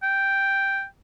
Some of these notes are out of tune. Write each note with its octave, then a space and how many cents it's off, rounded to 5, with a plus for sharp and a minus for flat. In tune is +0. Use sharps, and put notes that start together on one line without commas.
G5 +0